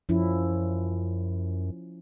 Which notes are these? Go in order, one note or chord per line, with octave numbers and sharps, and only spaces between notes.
F#2 F3 C#4 E4